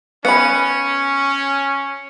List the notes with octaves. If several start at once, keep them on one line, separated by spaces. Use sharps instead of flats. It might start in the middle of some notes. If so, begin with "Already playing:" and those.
B3 C#4 B5 C#7